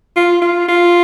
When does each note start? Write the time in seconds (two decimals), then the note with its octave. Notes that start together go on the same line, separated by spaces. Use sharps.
0.16 F4
0.41 F4
0.68 F4